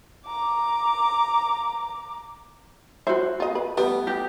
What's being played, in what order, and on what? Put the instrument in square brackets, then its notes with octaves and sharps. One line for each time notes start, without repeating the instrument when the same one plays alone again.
[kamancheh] A#5 D6
[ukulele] F#4 C5 [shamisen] C#5 E5
[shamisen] F4 D#5
B4
[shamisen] G3 A3 [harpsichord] B3
[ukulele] G4